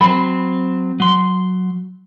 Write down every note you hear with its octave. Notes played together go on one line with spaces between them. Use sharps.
F#3 C4 B5
F#3 C6